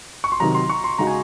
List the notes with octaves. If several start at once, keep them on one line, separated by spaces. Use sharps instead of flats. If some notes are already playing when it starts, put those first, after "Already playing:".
C#6
C6
C3 D#3 F#3 A#5
C6
C#6
C6
C#3 G#3 D#4 F#4 A#5
G#5